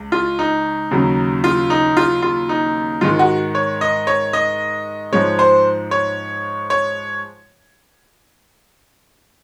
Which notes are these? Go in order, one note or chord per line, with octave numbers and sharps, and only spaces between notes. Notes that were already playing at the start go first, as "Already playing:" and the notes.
Already playing: C#2
F4
D#4
D#2 C#3 F#3
F4
D#4
F4
F4
D#4
G#2 D#3 G#3 F4
F#4
C#5
D#5
C#5
D#5
G#2 F3 G#3 C#5
C5
C#5
C#5